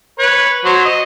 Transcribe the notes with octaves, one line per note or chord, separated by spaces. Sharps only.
B4 C#5
F#3 C5 C#6
D#5